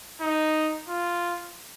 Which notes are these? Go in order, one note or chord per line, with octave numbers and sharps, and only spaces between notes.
D#4
F4